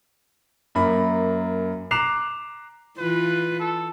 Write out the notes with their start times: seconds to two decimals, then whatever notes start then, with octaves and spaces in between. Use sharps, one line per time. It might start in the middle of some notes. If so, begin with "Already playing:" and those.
0.75 F#2 A#3 B5
1.91 A#5 D6 F#6 C7 E7 F7
2.98 E3 F4 B4
3.59 A4